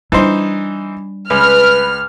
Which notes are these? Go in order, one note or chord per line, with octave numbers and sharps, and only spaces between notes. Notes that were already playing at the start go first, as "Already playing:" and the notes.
E3 G3 D4 D#4 C5
C#2 B4 F6